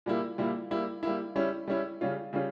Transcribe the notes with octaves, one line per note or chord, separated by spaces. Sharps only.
A#2 G3 A#3 E4
A#2 G3 A#3 E4
G3 A#3 E4
G3 A#3 E4
G3 C#4 E4
G3 C#4 E4
C#3 G3 C#4 F4
C#3 G3 C#4 F4